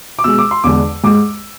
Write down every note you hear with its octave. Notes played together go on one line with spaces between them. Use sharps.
D6
B2 G#3 E6
D6
C6
E2 D3 G#3 D6
G#2 G#3 D6